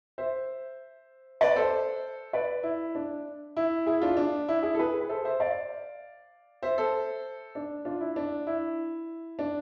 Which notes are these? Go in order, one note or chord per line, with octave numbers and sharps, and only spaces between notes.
C5 E5
B4 D5
A4 C5
B4 D5
E4
D4
E4
E4 G#4
D4 F4
D4
E4
E4 G#4
A4
G#4 B4
B4
A4 C5
C5 E5
D5 F5
C5 E5
A4 C5
D4
D4 F4
E4
D4
E4
D4